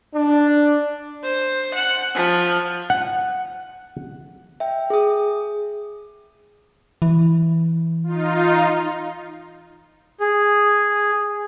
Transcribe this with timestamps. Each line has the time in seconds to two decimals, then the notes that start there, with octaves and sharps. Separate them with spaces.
0.14 D4
1.24 C5
1.75 F#5
2.15 F3
2.90 F#5
4.60 E5 G5
4.90 G#4 D#6
7.02 E3
8.03 D#4 F4
10.20 G#4